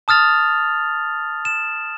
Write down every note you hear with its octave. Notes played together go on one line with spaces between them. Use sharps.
A5 D#6 F6 A6 F7
E7